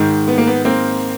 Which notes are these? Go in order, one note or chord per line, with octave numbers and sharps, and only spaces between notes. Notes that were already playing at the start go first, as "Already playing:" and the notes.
Already playing: G#2 D#3
B3
A#3
B3
A#3 C4